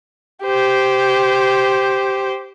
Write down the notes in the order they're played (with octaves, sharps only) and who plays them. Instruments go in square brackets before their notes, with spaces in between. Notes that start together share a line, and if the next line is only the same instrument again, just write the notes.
[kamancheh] G4 C5